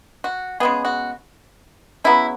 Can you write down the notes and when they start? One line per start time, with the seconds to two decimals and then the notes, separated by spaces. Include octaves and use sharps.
0.24 F#4
0.60 C#3 G#3 B3 G#4
0.85 F#4
2.04 C#3 F#3 B3 E4